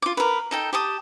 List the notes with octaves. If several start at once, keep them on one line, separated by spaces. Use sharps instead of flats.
F4 D6
A#4 B4
D#4 A4 G5
G4 A5 D#6